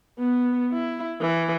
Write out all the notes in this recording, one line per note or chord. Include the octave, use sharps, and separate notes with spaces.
B3
E4
E3